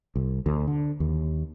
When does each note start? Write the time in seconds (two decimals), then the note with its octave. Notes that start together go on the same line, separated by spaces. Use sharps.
0.16 C2
0.46 D2
0.67 D3
1.00 D#2